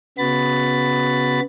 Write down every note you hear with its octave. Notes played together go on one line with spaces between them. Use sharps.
C#3 B3 F#4 B5 A6